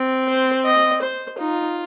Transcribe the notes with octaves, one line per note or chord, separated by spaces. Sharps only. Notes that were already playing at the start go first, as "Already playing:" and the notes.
Already playing: C4
C5
D#5
C5
D#4 F4